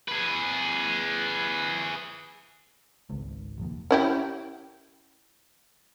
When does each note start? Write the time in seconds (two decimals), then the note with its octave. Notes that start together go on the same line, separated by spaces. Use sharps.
0.08 G#4 B4
3.10 G#1 C#2
3.58 F1 A#1 D#2
3.91 C#4 E4 G4